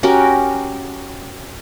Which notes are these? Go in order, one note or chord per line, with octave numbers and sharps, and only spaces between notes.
C#4 F#4 G4 A#4